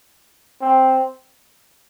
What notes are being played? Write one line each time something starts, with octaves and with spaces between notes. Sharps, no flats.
C4